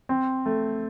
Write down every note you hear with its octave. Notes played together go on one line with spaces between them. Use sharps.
C4
A3